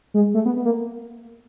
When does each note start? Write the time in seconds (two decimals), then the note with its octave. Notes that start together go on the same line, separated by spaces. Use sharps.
0.14 G#3
0.34 A3
0.46 B3
0.56 B3
0.65 A#3